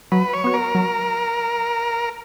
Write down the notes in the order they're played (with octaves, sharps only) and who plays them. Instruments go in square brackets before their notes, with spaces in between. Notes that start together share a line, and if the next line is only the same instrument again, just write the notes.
[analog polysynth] F#3 [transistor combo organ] B4
[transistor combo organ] C#5
[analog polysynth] B3 F#4
[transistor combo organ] A#4
[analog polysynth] F#3